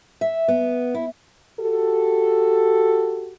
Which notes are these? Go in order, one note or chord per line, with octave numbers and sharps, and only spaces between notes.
E5
B3
E4
F#4 G4 A4